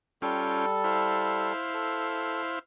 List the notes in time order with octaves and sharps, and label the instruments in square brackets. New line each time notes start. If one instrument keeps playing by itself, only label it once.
[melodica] G3 A4 [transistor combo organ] C#4 F4 G5
[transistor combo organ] E4 C5 F5
[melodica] A4